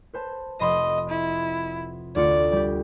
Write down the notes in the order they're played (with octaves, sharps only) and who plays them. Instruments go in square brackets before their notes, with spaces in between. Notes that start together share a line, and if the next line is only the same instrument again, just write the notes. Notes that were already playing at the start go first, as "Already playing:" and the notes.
[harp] B4 C5 A5
[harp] F1 B5 C6 [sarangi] D#5
[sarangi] E4
[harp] D2 F4 C#7 [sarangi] D5
[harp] G3 G4